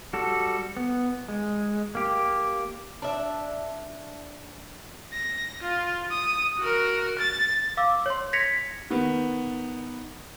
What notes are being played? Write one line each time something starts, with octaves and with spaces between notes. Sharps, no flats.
G3 F#4 A4
B3
G#3
A#3 G4
D4 E5
A#6
F4
D#6
F#4 A#4
A6
F5 D6 E6
C#5 C6
G#6 A#6 B6 C#7 F7
D#3 B3